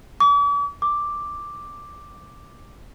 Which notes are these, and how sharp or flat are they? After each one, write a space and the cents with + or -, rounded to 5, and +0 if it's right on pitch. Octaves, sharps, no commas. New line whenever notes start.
D6 -45
D6 +0